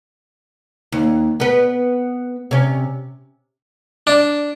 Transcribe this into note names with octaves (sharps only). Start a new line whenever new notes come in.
D#2
B3 B4
C3 C#4
D4